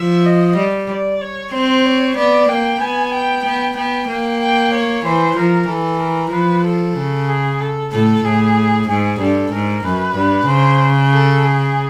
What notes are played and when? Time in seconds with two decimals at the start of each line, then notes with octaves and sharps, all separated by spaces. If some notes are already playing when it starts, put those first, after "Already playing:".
Already playing: F3 E5
0.25 D#5
0.56 G3
0.89 D5
1.21 C#5
1.52 C4 C5
1.85 C#5
2.16 B3 D5
2.48 A#3 G5
2.80 B3 G#5
3.13 G5
3.44 B3
3.76 B3 G5
4.09 A#3
4.40 G5
4.73 C#5
5.04 E3 C5
5.36 F3 A#4
5.68 E3 A4
6.00 A#4
6.32 F3 B4
6.65 A4
6.97 C#3
7.28 G#4
7.60 A4
7.92 A2 A4
8.24 A2 G#4
8.88 G#2 G#4
9.20 G2 A4
9.52 G#2 A#4
9.84 F#2 B4
10.16 G2
10.48 C#3 C5
11.12 A4
11.44 G#4